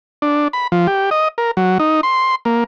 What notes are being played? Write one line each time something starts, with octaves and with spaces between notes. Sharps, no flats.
D4
B5
F3
G4
D#5
A#4
F#3
D#4
C6
A#3